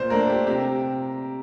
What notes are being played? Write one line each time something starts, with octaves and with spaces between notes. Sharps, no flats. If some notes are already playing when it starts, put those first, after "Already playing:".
Already playing: A#2 C5
A3 D4 A#4
G4
C3 G4